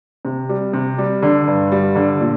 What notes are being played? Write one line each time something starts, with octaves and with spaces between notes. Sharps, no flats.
C3
G3
C3
G3
D3
G2
G3
D3
A#2